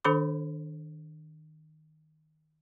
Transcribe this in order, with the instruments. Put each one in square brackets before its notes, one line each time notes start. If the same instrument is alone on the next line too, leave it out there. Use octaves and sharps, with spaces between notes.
[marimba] D#3 D4 A4 C5 B5 D6